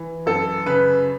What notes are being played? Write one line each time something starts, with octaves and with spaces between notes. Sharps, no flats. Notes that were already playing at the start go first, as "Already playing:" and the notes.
Already playing: E3
F#2 A4
C#3 B4